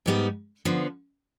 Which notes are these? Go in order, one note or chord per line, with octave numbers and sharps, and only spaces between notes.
G#2 G3 B3 D#4
D3 F3 B3